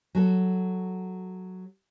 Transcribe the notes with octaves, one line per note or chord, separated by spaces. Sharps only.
F#3 F#4 A4